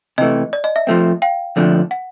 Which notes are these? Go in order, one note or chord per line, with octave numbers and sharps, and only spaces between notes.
C3 E3 A3 D#5
D5
D#5
E5
F3 A3 C4
F5 G5
F2 D3 F3 A3 D4
F#5